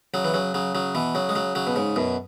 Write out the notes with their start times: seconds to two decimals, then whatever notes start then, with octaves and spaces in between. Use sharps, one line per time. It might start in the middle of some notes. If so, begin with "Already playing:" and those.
0.14 C#3 F#3
0.24 E3
0.34 C#3 F#3
0.54 C#3 F#3
0.75 C#3 F#3
0.95 B2 E3
1.15 C#3 F#3
1.29 G#3
1.35 C#3 F#3
1.55 C#3 F#3
1.67 B2
1.76 G#2 C#3
1.96 F#2 B2